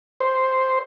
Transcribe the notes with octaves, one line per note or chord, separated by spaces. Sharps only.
C5